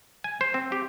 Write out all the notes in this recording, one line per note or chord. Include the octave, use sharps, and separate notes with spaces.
G#5
C5
C4
G4